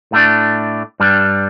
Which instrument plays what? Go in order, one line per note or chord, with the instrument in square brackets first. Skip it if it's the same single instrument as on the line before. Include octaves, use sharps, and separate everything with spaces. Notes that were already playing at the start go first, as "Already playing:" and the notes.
[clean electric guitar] A2 A3 D4
G2 G3 D4